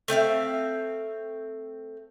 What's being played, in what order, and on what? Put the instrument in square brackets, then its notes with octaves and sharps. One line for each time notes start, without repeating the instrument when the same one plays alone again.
[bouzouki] A3 C4 E5 F5